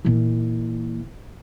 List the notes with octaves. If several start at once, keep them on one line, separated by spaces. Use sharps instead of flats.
A#2 E3